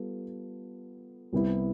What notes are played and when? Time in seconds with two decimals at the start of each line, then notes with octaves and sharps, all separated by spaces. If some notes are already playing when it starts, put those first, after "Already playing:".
Already playing: G3 B3 F4 A4
1.33 C2 C3 G3 B3 E4